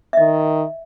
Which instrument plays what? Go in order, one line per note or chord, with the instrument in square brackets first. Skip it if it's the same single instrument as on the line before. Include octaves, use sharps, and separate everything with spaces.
[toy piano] E5
[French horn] D#3 [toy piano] D#5